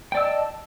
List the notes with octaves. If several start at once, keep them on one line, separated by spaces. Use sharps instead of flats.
D5 D#5 G5 A5 E6